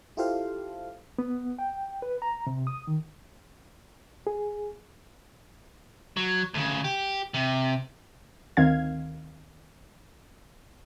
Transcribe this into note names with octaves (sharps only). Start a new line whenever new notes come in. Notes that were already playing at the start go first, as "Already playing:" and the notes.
E4 F4 G4 A4 C5 F5
B3
G5
B4
A#5
C3
D#6
D#3
G#4
F#3
D2 C#3
G4
C3
D2 D#3 C4 F5 G#6